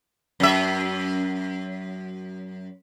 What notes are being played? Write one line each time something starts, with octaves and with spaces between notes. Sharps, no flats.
F#2 E5